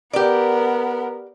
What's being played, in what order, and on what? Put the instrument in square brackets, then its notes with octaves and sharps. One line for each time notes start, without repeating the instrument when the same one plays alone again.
[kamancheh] B3 A#4 [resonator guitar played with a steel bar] G4 D5